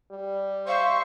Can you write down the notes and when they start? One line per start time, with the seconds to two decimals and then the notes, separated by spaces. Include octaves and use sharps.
0.11 G3
0.68 C5 E5 F5 C#6